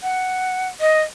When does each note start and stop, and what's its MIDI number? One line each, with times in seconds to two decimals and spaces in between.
0.03 0.68 78
0.81 1.01 75